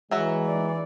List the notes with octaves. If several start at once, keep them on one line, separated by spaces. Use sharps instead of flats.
E3 F#3 G#3 F#4 E5
D5